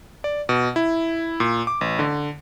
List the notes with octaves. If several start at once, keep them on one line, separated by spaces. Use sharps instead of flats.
D5
B2
E4
A#2
D6
A1
D3